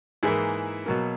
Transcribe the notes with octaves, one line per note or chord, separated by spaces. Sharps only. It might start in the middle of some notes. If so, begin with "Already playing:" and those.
G#2 E3 A#3 E4 G#4
B2 F#3 A#3